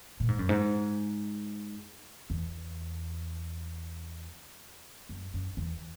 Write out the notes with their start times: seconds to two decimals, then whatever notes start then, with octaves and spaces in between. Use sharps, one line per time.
0.20 A#2
0.29 G#2
0.39 F#2
0.49 G#2
2.30 E2
5.09 F#2
5.34 F#2
5.57 E2